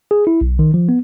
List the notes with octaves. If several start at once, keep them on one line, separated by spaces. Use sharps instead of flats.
G#4
E4
B1
D#3
F3
B3